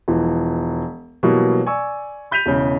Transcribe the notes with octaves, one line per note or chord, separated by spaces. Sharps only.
E1 E3 F3
B2 E3 F#3 G3 A#3 B3
D5 G#5 C#6 E6
B5 G6 B6 D#7 F7
E1 C#3 E4